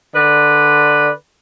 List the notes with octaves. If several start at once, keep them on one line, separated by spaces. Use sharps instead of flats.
D3 B4 D5